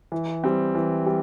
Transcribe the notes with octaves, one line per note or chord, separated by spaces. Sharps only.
E3
G3 C4
E3
G3